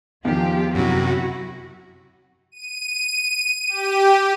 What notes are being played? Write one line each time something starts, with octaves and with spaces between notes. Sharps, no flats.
E2 D#3 F3 F4 G4
F#2 C3 F#3 E4 F#4
D#7
G4